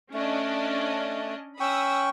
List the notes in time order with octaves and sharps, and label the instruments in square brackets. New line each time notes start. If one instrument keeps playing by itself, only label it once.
[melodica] A3 [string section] C#4 D4 D#5
[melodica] C#4 G5 C#6 [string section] B5 D#6 E6